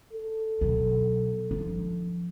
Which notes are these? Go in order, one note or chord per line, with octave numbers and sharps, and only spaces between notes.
A4
B2 F#3
F3 D4